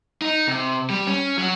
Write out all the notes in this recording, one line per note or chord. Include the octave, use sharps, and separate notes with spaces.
D#4
C3
G3
C#4
F#3